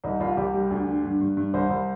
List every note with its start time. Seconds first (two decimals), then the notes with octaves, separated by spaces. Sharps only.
0.04 C2 D#4
0.20 C2 F4
0.37 C2 G4
0.54 G3
0.71 D2
0.87 D3
1.04 G2
1.21 G2
1.37 G2
1.54 C2 C5
1.70 C2